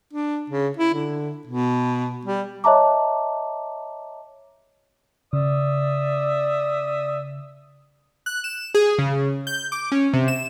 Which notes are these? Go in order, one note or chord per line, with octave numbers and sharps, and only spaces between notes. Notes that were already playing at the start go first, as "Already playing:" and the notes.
D4
C#3
E4
D3
B2
G3
C#5 D#5 E5 A5 A#5 D6
C#3 D5 E5 D#6
F#6
E7
G#4
C#3
G6
D6
C#4
C3
E7